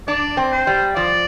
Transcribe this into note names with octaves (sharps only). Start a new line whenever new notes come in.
D4 D5
C4
C5
G3
F3 D5